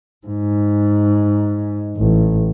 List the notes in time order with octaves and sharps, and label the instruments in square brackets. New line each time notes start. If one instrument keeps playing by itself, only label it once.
[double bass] G#2
A1